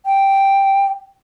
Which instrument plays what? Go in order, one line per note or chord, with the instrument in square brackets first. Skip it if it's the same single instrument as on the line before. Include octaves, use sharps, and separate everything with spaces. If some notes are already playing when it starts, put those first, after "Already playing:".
[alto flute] G5